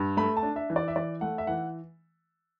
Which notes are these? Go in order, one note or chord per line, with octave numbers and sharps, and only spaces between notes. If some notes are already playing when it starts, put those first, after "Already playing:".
Already playing: G2
A3 B5
A5
D4
E5
E3
D5
E5
E3 D5
A3 F#5
E5
E3 F#5